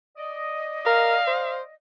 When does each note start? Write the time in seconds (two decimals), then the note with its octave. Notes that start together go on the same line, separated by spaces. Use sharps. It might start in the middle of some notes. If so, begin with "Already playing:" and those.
0.17 D5 D#5
0.86 A#4 F5
1.27 C5